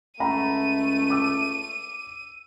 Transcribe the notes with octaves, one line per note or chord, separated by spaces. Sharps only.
C#2 A3 F#5 A#5 B5 D#7
D6 E6